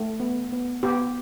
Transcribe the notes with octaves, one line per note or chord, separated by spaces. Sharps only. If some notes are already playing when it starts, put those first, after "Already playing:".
Already playing: A3
B3
B3
B3 G4